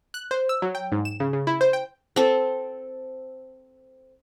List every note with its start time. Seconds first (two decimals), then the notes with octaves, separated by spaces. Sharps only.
0.14 F#6
0.31 C5
0.49 E6
0.62 F#3
0.75 G5
0.92 G#2
1.05 E7
1.20 C#3
1.33 C#3
1.47 E4
1.61 C5
1.73 G5
2.16 C4 A4